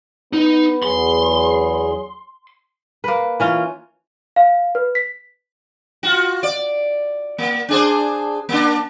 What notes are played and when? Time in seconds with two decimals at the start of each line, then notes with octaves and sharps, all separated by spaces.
0.33 B3 D#4
0.83 E2 F#3 G#4 C6
3.04 A#3 B4
3.40 E3 C#4 F4
4.36 F5
4.75 B4
4.95 B6
6.03 F4 F#4
6.43 D5
7.38 A#3
7.69 D4 G#4 C5
8.49 A#3 D4